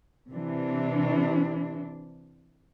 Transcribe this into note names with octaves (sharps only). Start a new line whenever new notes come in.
C3 E3 D4